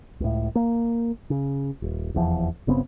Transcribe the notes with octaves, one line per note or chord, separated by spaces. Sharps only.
C#2 A2
A#3
C#3
D#1
F1 E2 F3
G1 C#3 B3 C4